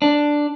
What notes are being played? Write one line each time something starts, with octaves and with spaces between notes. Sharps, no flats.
D4